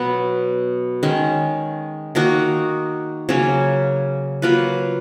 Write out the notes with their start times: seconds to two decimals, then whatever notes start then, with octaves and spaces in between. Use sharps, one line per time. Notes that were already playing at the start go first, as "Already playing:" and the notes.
Already playing: B2 F#3 B3
1.03 D#3 G#3 C#4
2.15 D#3 A#3 D#4 F#4
3.29 C#3 F#3 A#3 C#4
4.42 F#3 A#3 F4 B4